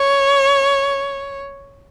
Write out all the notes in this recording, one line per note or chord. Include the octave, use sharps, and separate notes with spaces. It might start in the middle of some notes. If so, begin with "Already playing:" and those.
Already playing: C#5